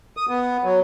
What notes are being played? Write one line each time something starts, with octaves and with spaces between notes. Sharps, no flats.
D#6
B3
F#3